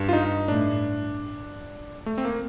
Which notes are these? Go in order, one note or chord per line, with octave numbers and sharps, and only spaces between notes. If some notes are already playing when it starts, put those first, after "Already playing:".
Already playing: G2
F4
D#4
A2 D4
A3
C4
A#3